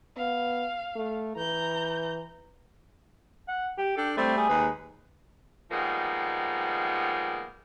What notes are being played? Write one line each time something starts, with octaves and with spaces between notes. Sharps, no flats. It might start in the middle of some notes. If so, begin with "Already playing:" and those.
B3 F5
A3
E3 A#5 G6
F#5
G4
D4 A4 G5
G3 A3 C4
G#4
D#2 G#3 B4
D#3 F3 G3 G#3 A#3 B3